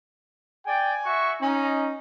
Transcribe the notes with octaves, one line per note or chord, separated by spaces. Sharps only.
D5 G5 G#5
F#4 E5 C#6
C#4 D#4